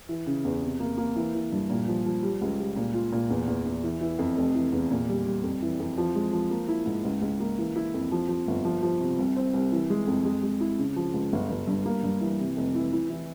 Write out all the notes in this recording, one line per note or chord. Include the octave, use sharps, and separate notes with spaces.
E3
C#3
E2
C3
A#3
A#3
E3
E3
G2
A#2
F3
F3
G3
C#2
G3
A#2
F4
A#2
E2
E2
E2
E3
E3
F2
F1
E3
E2
A#2
G3
G3
F2
E3
F2
F3
G#3
F3
A#3
E4
G#2
C#2
C#2
A#3
E3
E4
F2
F3
F3
G1
F3
F3
C3
C2
C4
C2
E3
G#3
F2
G#3
G#3
E4
C#3
F3
C#2
G1
G1
G2
A#3
G2
E3
C3
F1
E3
E4
E3